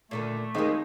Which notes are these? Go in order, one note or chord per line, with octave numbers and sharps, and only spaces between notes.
A#2 D3 D#3 A3
D#2 G#3 A#3 C4 D#4